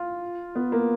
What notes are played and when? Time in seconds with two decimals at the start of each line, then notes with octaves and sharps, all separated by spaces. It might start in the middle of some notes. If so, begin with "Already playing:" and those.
Already playing: F4
0.55 B3
0.72 A#3